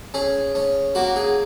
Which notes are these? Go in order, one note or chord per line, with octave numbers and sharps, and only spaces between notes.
C#4 G#4
C#4
A#3 F#4
G#4